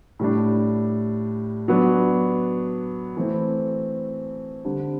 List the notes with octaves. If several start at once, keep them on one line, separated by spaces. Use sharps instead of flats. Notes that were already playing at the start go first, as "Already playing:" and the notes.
A2 G3 D4
F#3 B3 D4
E3 A3 C4
D3 G3 C4